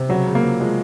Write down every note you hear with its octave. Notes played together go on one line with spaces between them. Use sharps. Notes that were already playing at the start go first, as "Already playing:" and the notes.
Already playing: C3
C#3 F#3
C#3
A#3
F3
F3 G#3